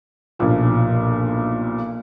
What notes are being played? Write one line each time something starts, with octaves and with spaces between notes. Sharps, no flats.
B1 G2 A#2 F3